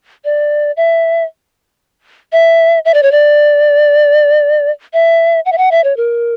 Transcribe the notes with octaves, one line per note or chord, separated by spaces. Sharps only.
D5
E5
E5
E5
D5
C#5
D5
E5
F#5
E5
F#5
E5
C#5
A#4